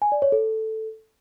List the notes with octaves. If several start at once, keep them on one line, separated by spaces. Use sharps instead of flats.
G#5
D5
C#5
A4